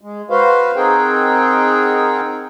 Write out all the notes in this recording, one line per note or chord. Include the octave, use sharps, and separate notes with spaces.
G#3
F#4 B4 C5 F5
C4 D#4 G#4 A#4 F#5 G5